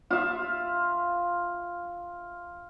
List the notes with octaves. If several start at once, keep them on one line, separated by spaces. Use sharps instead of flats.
F4 E5